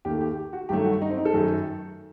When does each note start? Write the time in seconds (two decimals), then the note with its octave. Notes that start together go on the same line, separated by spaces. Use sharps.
0.05 D#2 D#3 A3 G4
0.21 G4
0.37 G4
0.53 F#4
0.69 G2 D#3 F#3 A3 G4
0.85 F#4
1.02 D#4
1.10 C4
1.18 D#4
1.25 A4
1.33 F#2 D#3 A3